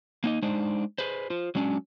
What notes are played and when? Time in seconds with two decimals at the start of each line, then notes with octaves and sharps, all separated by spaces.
0.24 A#3 D#4 D#5
0.43 G#3 D4 D#4 C5
0.98 G#4 B4 C5
1.30 F4 C5
1.55 F#3 G#3 C#4 D4